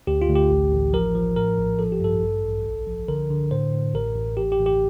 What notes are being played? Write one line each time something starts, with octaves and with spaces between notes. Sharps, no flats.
D2 G4
F4
D2
G4
A1
A1
F3 A#4
F3
A2 A#4
A#1
F3 A4
G4
G2 A4
A1
A1
C2
F3
D3 A#4
D3
A2 C5
A2
A1 A#4
A1
A1 G4
G4
A1
G4